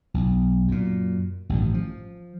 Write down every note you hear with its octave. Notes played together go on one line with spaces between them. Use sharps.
B1
F#2 A#2
A1 G2 D3 D#3
F3